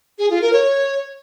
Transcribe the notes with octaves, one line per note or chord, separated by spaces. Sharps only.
G#4
F4
A#4
C#5